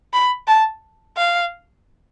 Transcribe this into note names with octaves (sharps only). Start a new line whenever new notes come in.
B5
A5
F5